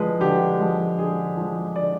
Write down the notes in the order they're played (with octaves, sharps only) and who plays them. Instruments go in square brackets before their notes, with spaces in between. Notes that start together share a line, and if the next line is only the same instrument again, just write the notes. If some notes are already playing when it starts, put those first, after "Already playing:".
Already playing: [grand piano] D3 F3 G#3 B4
D3 G4
F3 G#3
D3 G#4
F3 G#3
D3 D5